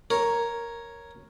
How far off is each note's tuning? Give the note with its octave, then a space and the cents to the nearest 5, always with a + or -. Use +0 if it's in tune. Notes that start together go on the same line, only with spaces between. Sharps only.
A#4 +0 C#5 +0